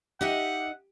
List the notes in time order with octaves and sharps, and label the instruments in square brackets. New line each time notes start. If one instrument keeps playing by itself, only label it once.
[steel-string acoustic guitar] D#4 D#5 E5 [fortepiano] G4 [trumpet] F#5